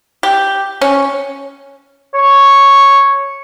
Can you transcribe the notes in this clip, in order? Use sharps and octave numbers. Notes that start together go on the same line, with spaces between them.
G4
C#4
C#5